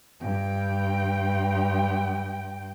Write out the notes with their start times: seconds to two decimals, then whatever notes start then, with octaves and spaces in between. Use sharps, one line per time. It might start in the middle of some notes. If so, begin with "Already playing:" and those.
0.21 G2 G5